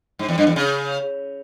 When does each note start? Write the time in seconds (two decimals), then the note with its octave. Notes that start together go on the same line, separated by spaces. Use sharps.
0.19 G#2
0.29 E2
0.38 G2
0.47 E2
0.56 C#3